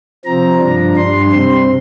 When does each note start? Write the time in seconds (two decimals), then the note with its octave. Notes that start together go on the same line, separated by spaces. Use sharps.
0.25 C3 F3 C4 A#5
0.60 G2 F3 D4
0.96 G2 G3 D4 C6
1.32 C3 G3 C4 C6